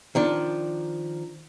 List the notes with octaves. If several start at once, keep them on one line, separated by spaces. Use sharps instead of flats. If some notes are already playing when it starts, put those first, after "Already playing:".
D#3 F3 D4